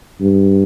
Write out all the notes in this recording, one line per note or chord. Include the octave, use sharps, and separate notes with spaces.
G2